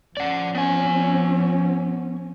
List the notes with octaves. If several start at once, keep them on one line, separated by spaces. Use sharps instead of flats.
F3 C#4 D5 F#5
B3 G#5